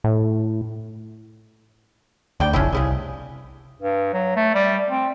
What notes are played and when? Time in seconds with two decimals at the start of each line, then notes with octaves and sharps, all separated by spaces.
0.04 A2
2.40 D2 D5 G5
2.53 F1 A#1 C#3 C#4 D4 E4
2.73 C2 C#3 E4 G#4
3.82 G2
4.13 F#3
4.36 A3
4.54 G3
4.90 C4